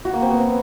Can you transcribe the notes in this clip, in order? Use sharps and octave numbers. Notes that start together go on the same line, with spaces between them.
F#4
A#3
C4
B3